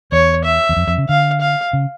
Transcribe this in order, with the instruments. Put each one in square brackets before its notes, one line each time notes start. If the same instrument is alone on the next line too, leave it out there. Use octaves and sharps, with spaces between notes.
[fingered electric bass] E2 [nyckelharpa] C#5
[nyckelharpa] E5
[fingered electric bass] E2
F2
F2
C#3
[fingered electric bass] D3 [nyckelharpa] F5
[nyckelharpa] F5
[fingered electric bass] C#3